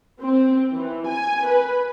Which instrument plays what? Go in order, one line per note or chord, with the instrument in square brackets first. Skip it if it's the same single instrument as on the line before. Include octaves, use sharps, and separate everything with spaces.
[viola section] C4
E3
G#5
B4